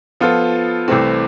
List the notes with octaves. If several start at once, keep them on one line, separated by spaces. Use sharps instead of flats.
F3 B3 F4 A4
C2 C3 E3 A3 C4